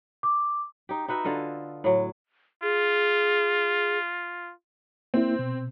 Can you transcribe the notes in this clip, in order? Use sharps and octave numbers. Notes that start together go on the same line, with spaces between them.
D6
D#4 G4
D#4 F#4 B4 E5
D3 F4 A4 D#5
A2 F#3
F4 G#4
A#3 C4 E4
B2